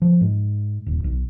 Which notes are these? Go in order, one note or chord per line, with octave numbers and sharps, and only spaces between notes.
F3
G#2
D#1
B1